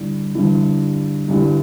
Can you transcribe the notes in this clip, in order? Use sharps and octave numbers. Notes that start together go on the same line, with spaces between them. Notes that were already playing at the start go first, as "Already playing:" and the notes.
Already playing: G2 D3 G3 E4
G2 D3 G3 E4
G2 D3 G3 E4